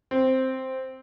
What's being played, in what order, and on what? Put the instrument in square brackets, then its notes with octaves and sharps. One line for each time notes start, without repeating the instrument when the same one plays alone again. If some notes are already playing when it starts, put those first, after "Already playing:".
[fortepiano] C4